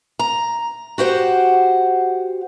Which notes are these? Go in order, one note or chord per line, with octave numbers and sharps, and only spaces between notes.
A#5
F#4 G4 C5 F#5